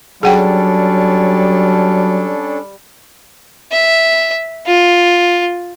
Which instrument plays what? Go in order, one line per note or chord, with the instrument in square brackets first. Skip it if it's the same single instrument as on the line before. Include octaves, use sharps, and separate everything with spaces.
[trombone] F#3 [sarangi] G3 [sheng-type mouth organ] C#4 D4 A4 [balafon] G#4 F#5 G5
[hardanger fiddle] E5
F4